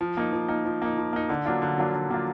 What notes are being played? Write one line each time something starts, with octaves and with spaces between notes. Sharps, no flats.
F3
A#3 D#4
F3
A#3 D#4
F3
A#3 D#4
F3
A#3 D#4
D3
F#3 A#3 D4 F4
D3
F#3 A#3 D4 F4
D3
F#3 A#3 D4 F4